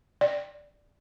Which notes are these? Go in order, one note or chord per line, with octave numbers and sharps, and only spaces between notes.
D5